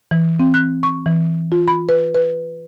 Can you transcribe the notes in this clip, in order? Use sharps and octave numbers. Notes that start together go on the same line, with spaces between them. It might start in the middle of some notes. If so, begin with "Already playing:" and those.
E3
C4
F#6
C#6
E3
F4
B5
B4
B4